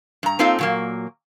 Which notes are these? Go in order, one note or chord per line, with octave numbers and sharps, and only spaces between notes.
G2 A#5
A#3 C4 D#4 F4 A4
A#2 F#3 A#3